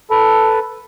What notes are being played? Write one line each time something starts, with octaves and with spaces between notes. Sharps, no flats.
A4 B4